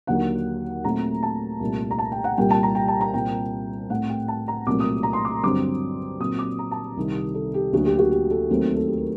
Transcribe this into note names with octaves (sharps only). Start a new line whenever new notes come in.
D#2 D3 F#3 A#3 F#5
A#2 F#3 A3 C4 A#5
A5
C2 A#2 A3
A#5
A5
G5
F#5
C2 A#2 G3 G5
A5
A#5
G5
A5
A#5
C2 A#2 G3 C4 G5
A2 A3 C4 F#5
G5
A5
A#5
C2 A#2 F#3 A3 C4 D6
D#6
A#5
C6
D6
G2 D3 F#3 C4 D6
A#2 F#3 C4 D#6
D6
A#5
A5
C2 C3 D#3 G3
A4
G4
D2 D3 F#3 A#3 F#4
G4
F#4
G4
A4
D#2 D#3 F#3 A3 C4
A4
G4
A#4